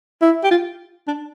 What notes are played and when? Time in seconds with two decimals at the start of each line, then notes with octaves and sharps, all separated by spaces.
0.22 E4
0.44 G4
0.51 F4
1.08 D4